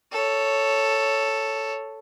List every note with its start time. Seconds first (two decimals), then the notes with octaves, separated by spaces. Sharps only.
0.12 A4 C#5